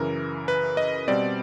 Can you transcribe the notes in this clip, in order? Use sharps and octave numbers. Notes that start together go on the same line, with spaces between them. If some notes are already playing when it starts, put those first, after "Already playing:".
Already playing: F#2 C#3 E3 A#4
B4
D#5
B2 G3 C4 D5